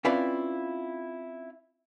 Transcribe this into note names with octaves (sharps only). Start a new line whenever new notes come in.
C4 C#4 E4 F4 B4 D5